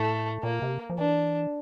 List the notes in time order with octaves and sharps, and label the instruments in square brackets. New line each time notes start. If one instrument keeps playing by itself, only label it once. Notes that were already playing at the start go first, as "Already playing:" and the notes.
Already playing: [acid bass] A2 [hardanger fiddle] A3
[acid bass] A#2 [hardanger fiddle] A#3
[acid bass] C3
F3
[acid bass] E3 [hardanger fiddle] D4